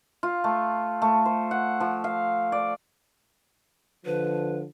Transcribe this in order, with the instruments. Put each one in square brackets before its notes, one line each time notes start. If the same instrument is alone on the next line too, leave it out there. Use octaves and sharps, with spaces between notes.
[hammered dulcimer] F4
A3
A3
C5
F#5
F3
F5
D5
[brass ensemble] D3 F3 [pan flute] B4